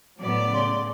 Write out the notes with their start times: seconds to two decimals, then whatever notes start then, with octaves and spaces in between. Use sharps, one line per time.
0.21 A2 F#3 B3 D5
0.53 C#3 C6